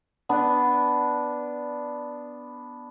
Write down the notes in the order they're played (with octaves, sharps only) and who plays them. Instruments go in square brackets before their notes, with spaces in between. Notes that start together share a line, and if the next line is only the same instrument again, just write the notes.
[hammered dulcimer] B3 D4